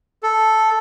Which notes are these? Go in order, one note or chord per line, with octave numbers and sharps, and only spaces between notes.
A4